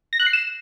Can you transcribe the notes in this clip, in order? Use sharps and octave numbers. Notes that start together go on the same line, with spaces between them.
A#6
F#6
C7
E7